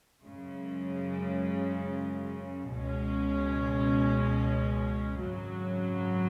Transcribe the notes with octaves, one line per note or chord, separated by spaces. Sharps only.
F#2 C#3 G#3
C#2 B2 G#3 C#4
G#1 F#2 C#3 F#3